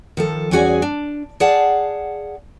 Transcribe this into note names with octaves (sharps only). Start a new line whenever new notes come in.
D#3 F3 A4
E2 G3 C#4 F#4 G#4 G#5
D4
G#4 D5 F5 F#5 A5